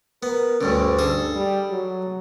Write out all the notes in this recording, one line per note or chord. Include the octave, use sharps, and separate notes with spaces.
B3 A#4
D2 G2 D3 C#4
G2 G#4 A4
G3
F#3